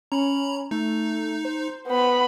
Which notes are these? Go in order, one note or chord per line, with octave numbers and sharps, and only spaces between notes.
C#4 A#5 B5
A3 D#4
C5
B3 B5